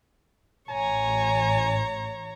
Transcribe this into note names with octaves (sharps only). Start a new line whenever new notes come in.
A1 C#5 G#5 A#5